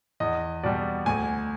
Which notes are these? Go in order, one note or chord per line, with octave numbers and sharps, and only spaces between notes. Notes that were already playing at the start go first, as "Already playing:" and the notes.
E2 D#5
B2 G3 D5
D2 G#5